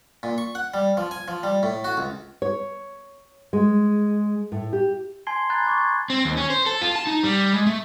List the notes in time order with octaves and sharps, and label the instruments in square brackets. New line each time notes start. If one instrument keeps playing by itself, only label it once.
[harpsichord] A#2
C#6
F#5
G3
F3
G#5
F3
G3
A2
F#4
C#2
[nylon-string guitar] C#5
G#3
A2
G4
[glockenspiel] G#5 A5 C6 G#6 C7 G7
G#5 A#5 B5 F#6 G#6 A6
C#6 D6 G#6 A6
F#6 G#6
[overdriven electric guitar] C4
D#2
C#4
C5
A4
F4
A5
D#4
G3
G#3
A3